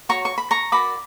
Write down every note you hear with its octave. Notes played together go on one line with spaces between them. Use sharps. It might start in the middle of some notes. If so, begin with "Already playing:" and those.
F#4 C#5 A#5 C#6
C#6
B5
A#5 C#6
F#4 A#4 D5 B5 D6